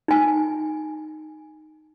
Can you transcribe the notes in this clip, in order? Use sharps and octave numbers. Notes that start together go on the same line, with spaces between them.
D#4 G#5